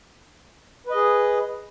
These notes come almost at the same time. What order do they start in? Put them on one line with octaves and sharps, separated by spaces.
B4 D#5 G#4